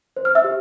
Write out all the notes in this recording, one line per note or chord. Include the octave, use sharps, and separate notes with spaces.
C5
F6
E5 E6
G4